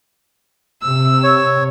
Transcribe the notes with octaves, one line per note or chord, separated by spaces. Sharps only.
C3 E6
C#5